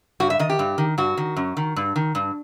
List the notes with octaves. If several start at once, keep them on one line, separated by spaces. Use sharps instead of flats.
G2 F#4
E5
D#3 D#5
G4
G2
D#3
G2 F#4
D#3
F#2
D#3
G2
D#3
G2